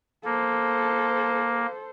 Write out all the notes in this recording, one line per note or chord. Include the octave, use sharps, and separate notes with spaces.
A#3 A4 C5